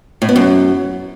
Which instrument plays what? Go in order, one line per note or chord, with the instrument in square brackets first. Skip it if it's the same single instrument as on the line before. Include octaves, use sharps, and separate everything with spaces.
[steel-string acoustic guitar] A2
B3
F#2